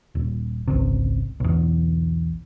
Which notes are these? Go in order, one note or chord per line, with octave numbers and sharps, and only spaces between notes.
D#1
G#1 C#2 C3
B1 E2